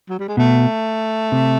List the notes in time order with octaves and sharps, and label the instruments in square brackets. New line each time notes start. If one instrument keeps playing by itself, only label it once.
[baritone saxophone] F#3
G3
G#3
[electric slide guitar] B2 [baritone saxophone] A3
[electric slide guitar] C3